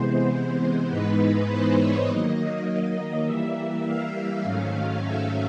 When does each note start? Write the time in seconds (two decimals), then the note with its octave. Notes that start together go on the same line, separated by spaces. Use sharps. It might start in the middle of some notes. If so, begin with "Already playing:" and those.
Already playing: C3 E3 G#3 B3 C5
0.89 G#2 E3 G#3 B3 D#4 B4
1.49 C5
1.78 C#5
2.08 D#3 F#3 A#3 D#5
3.25 E3 G3 A#3 E5
3.85 F5
4.43 G#2 D#3 F#3 A3 C#4
5.02 E5